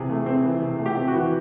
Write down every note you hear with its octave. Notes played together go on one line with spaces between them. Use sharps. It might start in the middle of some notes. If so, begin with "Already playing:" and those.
Already playing: C3 E3 G#4
A3
C4
E3
C3
A3
G4
C4
F#4
E3